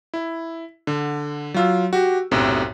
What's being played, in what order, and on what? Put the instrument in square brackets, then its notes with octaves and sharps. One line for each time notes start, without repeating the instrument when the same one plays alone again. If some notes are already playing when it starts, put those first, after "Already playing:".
[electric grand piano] E4
D3
F#3 F4 E6
F#4 G4
B1 F#2 A2 C3